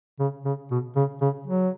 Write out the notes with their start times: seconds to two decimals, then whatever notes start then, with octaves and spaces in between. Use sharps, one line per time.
0.20 C#3
0.45 C#3
0.71 B2
0.96 C#3
1.21 C#3
1.47 F#3